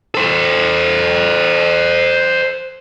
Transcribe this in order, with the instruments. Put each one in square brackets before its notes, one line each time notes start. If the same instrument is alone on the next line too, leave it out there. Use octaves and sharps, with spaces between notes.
[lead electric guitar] A4 C5